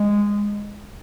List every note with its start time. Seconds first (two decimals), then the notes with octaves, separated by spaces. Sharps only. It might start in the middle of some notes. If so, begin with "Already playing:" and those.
Already playing: G#3